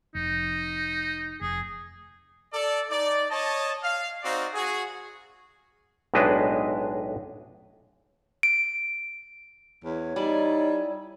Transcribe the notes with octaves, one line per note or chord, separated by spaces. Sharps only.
F1 D#4
F1 G#4
A4 D5
D#4 D5
C#5 D#5 A5
F5
C4 D#4 F#4 D5 F5
F#4 G#4
B1 A2 G#3 D4 B4 D#5
D7
E2 C#5
G3 D#4 E4 D5 G#5